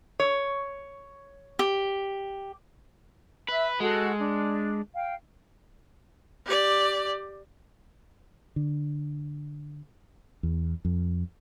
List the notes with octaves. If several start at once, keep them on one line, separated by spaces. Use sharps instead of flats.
C#5
G4
B4 E5
G#3 F#4 A4
D4
F5 G5
G4 D5
D3
E2
F2